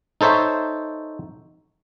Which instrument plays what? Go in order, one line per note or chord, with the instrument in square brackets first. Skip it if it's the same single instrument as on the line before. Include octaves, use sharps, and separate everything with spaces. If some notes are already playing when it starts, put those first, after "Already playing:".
[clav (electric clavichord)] D#4 A4 C5 C#5 E5